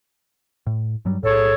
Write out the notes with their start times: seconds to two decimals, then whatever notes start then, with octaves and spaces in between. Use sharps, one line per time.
0.67 A2
1.05 G2 F#3 G3
1.23 B1 A2 G#4 A4 C#5